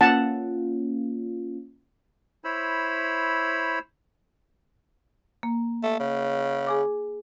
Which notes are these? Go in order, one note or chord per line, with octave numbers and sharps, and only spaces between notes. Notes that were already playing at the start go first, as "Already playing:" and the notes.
A#3 C#4 F4 F#5 A5
E4 C5 C#5 B5 E6
A#3
A3
C#3
G#4 G#5 D6